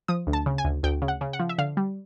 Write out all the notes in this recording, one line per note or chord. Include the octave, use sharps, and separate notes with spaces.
F3 D#6
D2
A5
C#3
G#5
D2
D2 G5
C#3
F#5
C#3
F#5
F3
E5
D3 F5
G3